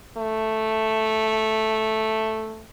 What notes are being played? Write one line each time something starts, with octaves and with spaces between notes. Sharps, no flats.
A3